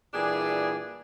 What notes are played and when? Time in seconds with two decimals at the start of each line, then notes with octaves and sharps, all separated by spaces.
0.14 A#2 E3 G3 D4 G#4